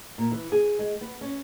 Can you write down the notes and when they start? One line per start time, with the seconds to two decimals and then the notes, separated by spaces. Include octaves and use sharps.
0.18 A#2
0.32 E3
0.52 G#4
0.79 G#3
1.01 B3
1.21 C#4